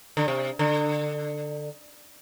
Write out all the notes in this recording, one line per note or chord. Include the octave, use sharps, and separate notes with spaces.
D3
C3
D3